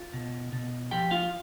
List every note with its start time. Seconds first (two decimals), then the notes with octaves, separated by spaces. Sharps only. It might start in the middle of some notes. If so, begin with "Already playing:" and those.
Already playing: F4
0.13 B2
0.53 B2
0.91 F3 G4 G5
1.11 F4 F5